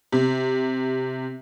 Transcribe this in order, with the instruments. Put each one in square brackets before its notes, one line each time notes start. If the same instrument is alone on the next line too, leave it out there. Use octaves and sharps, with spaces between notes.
[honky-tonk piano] C3